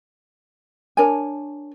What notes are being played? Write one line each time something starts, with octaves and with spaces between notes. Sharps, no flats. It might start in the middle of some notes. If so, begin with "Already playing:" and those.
D4 A#4 C#5 G#5